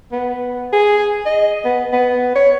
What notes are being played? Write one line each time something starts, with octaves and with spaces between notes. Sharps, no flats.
B3
G#4
D#5
B3
B3
C#5